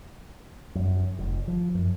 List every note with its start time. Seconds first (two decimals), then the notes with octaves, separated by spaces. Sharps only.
0.75 F#2
1.18 F1
1.48 F3
1.74 F#2